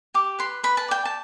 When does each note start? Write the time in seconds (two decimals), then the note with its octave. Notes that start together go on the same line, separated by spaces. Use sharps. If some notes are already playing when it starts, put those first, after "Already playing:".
0.14 G4 D6
0.39 B4 C6
0.63 B4 B5
0.77 A5
0.88 D5 G5
1.05 A5